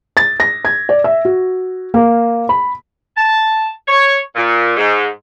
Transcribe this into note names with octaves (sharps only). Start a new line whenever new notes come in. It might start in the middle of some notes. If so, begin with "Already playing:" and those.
A6
A#6
G#6
D5
E5
F#4
A#3
B5
A5
C#5
A#2
G#2